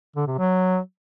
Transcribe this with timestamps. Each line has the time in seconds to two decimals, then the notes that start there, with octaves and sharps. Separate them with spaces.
0.16 D3
0.27 C3
0.38 F#3